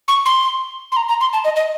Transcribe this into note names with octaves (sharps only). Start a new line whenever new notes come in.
C#6
C6
C6
A#5
A#5
C6
A5
D#5
D#5